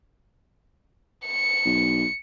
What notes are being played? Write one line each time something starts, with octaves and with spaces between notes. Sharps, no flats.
C#7
B1